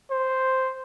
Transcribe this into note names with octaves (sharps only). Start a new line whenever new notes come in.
C5